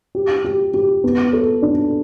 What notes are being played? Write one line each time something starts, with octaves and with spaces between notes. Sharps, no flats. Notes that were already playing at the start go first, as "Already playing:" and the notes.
G4
G4
G4
B3
A4
D4